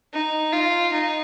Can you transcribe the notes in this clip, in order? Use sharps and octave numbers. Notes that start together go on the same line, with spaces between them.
D#4
F4
D#4